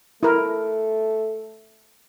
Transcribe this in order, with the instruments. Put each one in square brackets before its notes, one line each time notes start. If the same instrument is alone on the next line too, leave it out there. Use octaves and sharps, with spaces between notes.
[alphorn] A3 [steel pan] E4 A#4